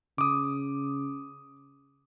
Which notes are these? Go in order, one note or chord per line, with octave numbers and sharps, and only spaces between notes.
C#3 D6 D#6